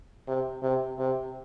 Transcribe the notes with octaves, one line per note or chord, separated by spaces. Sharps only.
C3
C3
C3